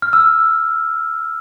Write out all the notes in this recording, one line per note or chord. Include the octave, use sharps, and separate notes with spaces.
F6
E6